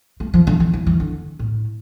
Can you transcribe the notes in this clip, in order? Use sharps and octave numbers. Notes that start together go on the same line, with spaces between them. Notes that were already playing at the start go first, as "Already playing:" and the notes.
A3
F3
D3
E3
E3
E3
D3
A2